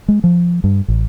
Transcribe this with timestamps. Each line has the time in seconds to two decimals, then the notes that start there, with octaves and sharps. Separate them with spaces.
0.08 G#3
0.24 F3
0.64 G2
0.88 A1